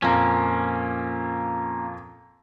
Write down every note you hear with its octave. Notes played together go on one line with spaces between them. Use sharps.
F2 A#2 A#3 C#4 A#5